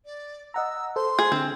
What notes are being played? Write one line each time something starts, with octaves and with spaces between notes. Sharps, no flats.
D5
D#5 F#5 A#5 E6
A4 C5 C6
G#4
D3 C4